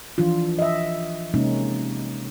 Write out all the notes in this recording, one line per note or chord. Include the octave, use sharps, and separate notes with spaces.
E3 F3 D4 F4
D#5 E5
C3 G#3 A#3 C#4 D#4